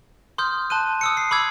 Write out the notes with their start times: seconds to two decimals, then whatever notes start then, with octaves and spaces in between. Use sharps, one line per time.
0.38 C6 D#6 F6 G6
0.70 A5 C6 F#6 D#7
1.01 D#6 E6 C#7
1.17 C7
1.31 B5 D6 E6 G#6